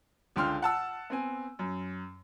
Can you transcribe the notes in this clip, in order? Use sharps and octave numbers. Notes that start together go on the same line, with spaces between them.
C#2 D3 G5 C6 F6
F#5 A5 E6
B3 C4 G#5
F#2